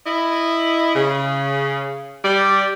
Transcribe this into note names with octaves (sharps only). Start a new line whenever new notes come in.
E4 D#5
C#3
G3 D5